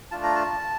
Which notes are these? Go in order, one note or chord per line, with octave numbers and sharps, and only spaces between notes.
A3 D4 F4 A5
A#5
A5